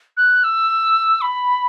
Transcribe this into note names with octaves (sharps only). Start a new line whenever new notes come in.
F#6
E6
B5